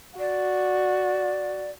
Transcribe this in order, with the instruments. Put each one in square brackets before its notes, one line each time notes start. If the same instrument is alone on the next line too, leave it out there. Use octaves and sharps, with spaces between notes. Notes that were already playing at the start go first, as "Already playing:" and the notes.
[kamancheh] F#4 [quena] D5